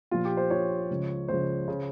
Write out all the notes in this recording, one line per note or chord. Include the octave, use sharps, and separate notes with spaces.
A#1 A#2 F3 F4
G4
C5
A#1 A#2 F3 C#5
C#2 C#3 F3
C#2 C#3 F3 C5
C#3